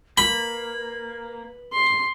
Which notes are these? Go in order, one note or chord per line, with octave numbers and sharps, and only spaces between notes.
A#3 B4 B5
C6